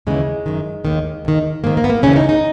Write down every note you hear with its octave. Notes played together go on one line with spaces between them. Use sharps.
D#2 C#3 E3 G#3
F#2 D#3
D#2 D#3
D#2 D#3
G#2 D#3 A#3
A#3
B3
A#3
D#2 C#3 E3 C#4
D#4
D#4